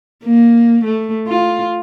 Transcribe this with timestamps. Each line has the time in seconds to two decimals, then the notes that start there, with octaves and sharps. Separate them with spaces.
0.24 A#3
0.84 A3
1.28 F4